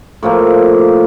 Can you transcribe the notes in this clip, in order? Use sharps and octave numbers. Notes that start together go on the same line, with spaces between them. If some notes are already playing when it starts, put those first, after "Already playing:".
A2 F3 A#3